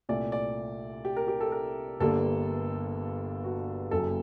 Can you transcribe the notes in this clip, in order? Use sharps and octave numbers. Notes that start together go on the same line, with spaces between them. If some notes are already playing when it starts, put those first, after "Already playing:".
C2 A#2 A3 D5
D5
G4
A#4
G4
A4
A#4
G1 G2 D3 G3 A#3 A4
F#4
F#1 F#2 F#3 A#3 A4